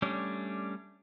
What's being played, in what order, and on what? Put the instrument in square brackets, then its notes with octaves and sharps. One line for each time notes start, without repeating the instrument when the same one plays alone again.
[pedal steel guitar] G3 A3 C#4 D4